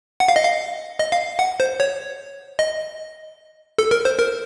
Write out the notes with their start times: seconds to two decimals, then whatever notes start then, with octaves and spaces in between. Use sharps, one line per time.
0.20 F#5
0.28 F5
0.36 D#5
0.44 F5
0.99 D#5
1.12 F5
1.39 F#5
1.60 C5
1.80 C#5
2.59 D#5
3.78 A4
3.91 A#4
4.05 C5
4.19 A#4